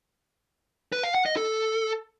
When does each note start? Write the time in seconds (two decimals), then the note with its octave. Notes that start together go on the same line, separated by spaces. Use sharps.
0.92 B4
1.03 F5
1.15 F#5
1.26 D#5
1.37 A4